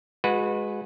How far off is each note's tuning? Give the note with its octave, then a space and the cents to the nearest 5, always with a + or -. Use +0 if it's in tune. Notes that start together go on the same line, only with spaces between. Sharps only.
G#3 +0 F#4 -30 B4 +0